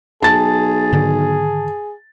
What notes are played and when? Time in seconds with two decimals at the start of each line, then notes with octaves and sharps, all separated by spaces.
0.22 B1 G#4 A5 A6
0.92 G#2 D3 D#3